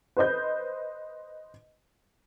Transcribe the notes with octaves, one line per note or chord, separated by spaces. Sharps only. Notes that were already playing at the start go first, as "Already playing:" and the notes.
B4 C5 D#5 G6